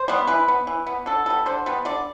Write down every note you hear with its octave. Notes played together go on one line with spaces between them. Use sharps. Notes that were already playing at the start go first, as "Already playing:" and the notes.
Already playing: C5
G3 B3
E3 B4
B3
E3
B3
D3 A4
G3 B3 A4
D3 C5
G3 B3
D3 D5